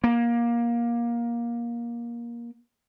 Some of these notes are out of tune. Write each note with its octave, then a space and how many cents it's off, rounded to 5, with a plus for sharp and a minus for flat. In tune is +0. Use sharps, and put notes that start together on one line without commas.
A#3 +20